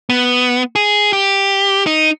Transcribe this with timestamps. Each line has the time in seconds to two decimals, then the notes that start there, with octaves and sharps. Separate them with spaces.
0.10 B3
0.76 G#4
1.13 G4
1.87 D#4